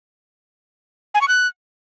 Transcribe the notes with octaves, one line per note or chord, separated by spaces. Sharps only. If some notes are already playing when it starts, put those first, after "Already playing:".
G#5
C#6
F#6